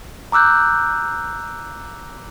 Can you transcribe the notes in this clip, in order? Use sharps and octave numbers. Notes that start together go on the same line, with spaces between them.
A#5 D6 E6 F#6 G6